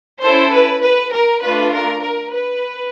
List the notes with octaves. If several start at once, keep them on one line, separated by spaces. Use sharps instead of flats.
C#4 E4 A4 C5
B4
B4
A#4
A3 D4 F4 B4
A#4
A#4
B4